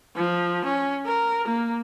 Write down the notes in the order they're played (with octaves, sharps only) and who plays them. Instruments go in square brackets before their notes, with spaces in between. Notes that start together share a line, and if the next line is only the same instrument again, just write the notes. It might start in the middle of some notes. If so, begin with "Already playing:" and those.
[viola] F3
C#4
A#4
A#3